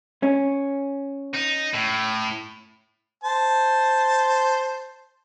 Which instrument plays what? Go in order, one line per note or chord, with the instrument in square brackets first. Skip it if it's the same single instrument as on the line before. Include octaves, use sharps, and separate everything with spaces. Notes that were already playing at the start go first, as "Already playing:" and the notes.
[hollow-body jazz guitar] C#4
[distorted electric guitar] D#4
A2
[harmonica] C5 A5